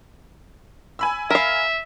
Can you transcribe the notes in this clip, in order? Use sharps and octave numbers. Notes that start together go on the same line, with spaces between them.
G#5 B5 E6
A#4 E5 F5